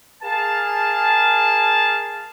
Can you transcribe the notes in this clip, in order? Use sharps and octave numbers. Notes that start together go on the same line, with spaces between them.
G#4 A#4 F5 A5